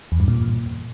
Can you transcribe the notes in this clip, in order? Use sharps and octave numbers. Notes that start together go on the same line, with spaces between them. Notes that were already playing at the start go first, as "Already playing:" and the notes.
E2
G2
A#2